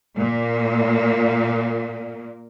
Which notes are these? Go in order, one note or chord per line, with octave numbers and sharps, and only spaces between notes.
A#2 A#3